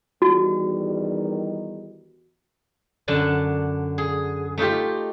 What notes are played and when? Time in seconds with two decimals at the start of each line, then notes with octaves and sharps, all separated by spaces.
0.22 E2 D#3 G3 F#4
3.08 F#2 D3 D4 A5
3.98 G#4
4.58 A3 D#4 F4 G4